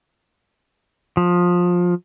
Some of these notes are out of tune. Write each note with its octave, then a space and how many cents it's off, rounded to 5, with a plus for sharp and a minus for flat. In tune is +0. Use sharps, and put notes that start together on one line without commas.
F3 +20